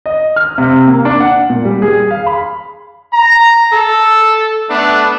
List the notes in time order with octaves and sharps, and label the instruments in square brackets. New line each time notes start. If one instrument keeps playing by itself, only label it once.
[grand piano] D#5
F6
C3
A#3
D4
F#5
A#2
G3
G#4
F5
B5
[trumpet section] A#5
A4
A3 B3 D4